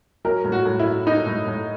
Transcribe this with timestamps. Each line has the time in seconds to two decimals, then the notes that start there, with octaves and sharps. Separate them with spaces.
0.25 F#3 A#4
0.44 A2
0.52 F#4
0.65 A2
0.80 E4
0.85 F#3
1.06 F#3 D#4
1.26 A2
1.47 A2